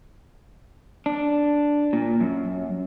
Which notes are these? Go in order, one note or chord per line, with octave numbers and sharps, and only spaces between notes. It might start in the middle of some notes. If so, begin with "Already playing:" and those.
D4
A#2
F#2